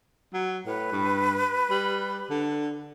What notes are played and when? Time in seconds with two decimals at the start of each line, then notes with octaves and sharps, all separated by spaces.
0.34 F#3
0.66 A2 B4
0.92 G2
1.70 G3
2.30 D3